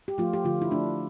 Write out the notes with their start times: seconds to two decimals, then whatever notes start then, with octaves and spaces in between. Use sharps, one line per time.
0.08 G4
0.18 F3 A3 F4
0.33 G4
0.44 D3 F3 F4
0.62 E4
0.71 A3 D4